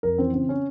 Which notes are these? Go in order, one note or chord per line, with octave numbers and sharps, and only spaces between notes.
F2 A#4
E3 C4
C#3 C4
C#4